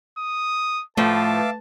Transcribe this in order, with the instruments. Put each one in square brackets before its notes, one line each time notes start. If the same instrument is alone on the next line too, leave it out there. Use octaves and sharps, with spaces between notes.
[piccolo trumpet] D#6
[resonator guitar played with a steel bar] A2 F3 [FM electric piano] A3 B4 [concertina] E5 F5 D6 [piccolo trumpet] A5